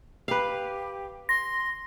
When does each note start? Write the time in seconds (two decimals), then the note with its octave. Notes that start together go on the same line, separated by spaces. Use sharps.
0.28 G4 B4 F5
1.29 C6 A#6